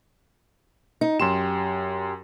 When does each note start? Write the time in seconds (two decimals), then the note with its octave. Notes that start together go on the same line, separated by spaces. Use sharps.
1.01 D#4
1.20 F#2 G4 C6 E7